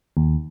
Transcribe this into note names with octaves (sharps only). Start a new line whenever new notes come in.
D#2